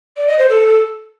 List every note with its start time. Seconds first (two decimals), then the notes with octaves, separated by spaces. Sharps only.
0.16 D5
0.27 D#5
0.38 C5
0.49 A4